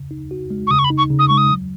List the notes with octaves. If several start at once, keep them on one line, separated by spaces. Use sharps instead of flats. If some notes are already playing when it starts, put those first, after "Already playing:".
Already playing: C#3
D#4
F#4
G#3
C#6
C#3 D#6
C#6
B5
D#4
C#6
C#3
D#6
G#3 C#6
D#6
F#3